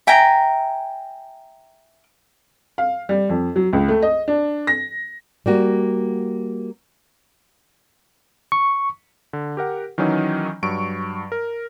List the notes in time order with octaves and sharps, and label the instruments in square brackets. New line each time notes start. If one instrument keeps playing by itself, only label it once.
[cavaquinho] E5 G5 G#5 A#5
[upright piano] F5
G3
F2
F#3
C#2
A3
D#5
D4
A#6
[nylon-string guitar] G3 A#3 F#4
[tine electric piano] C#6
[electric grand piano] D3
G4 A#4 F#5
D#3 E3 F#3 C#4 D#4
G2 F#3 C#6 D7
A#4